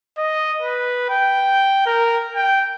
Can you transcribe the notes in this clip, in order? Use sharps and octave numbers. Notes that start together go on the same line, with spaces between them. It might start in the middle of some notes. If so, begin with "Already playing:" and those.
D#5
B4
G5
A#4
G5